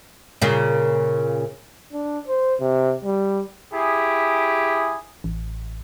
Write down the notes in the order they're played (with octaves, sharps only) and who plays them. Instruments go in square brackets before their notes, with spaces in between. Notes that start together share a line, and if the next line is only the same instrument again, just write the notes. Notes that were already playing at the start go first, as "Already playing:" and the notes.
[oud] A#2 C#3
[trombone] D4
C5
C3
G3
[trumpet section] E4 G4 G#4
[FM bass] A1